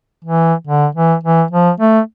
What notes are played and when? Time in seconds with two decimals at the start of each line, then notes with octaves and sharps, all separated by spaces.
0.24 E3
0.67 D3
0.95 E3
1.24 E3
1.51 F3
1.80 A3